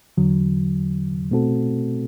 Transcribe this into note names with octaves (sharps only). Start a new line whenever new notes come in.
E2 D3 F#3
B2 A3 C4 F#4 A4